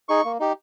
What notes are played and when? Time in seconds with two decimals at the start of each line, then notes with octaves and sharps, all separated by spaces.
0.09 D#4 G#4 C#6
0.25 A#3
0.40 D#4 G4